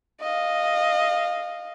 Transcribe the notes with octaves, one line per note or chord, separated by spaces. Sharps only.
D#5 F5